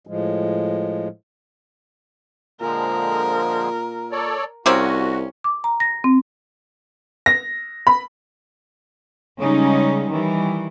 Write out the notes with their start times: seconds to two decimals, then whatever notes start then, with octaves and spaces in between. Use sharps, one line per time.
0.07 A2 F3 G#3
2.61 A#2 D3 F3 G#3 A#4
4.12 A4 C#5 D5
4.66 C2 A#3 C4 C#4 F#4
5.44 D6
5.64 A#5
5.80 A#6
6.04 C4
7.26 A#6
7.87 B5
9.38 C#3 G3 G#3 C#4 D#4
10.09 D#3 E3 G3